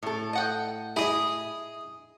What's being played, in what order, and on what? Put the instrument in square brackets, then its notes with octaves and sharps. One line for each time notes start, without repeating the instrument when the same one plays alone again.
[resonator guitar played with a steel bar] A2 A4
[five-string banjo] D#5 F#5 G5
[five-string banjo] E4 [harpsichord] G#4 D#5